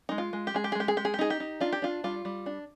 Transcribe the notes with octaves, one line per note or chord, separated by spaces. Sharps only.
G#3 D#4
F4
G#3
G4
G#3 G#4
G4
G#4
G#3 G4
G#4
G#3 G4
G#4
G4
D#4 G#4
G4
D#4
D4 F4
G4
D4 F4
G3 F4
G3
D4